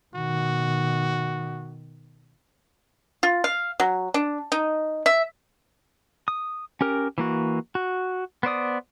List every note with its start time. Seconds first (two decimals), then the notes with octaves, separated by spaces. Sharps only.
0.15 B2 D#3 F#4
3.23 F4
3.44 F5
3.80 F#3
4.14 D4
4.52 D#4
5.06 E5
6.28 D#6
6.81 C#4 G4 A#4
7.18 E3 A#3 F#4
7.75 F#4
8.43 B3 C5 D5 D#6